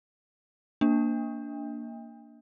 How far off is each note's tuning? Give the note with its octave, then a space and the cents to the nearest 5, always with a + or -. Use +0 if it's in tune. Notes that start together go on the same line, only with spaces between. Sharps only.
A#3 -5 D4 -10